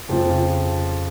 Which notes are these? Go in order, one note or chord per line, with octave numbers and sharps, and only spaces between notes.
F2 C#3 F3